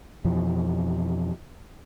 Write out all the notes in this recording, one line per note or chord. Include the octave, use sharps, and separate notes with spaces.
F2 B2 E3 F3